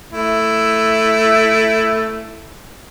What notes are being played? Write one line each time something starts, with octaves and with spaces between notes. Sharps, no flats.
A3 E4